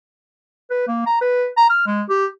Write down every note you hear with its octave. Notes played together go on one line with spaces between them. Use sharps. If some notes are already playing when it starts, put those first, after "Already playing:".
B4
A#3
A#5
B4
A#5
F6
G#3
G4